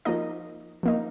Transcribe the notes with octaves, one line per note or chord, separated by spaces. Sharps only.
F3 A#3 D#4 D#5
F3 A#3 D#4